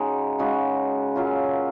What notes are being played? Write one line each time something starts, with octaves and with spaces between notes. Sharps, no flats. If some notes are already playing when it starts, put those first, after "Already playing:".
Already playing: C#3 G#3 D#4 F#4
C#3 G#3 D#4 F#4
A#2 F#3 C#4 F4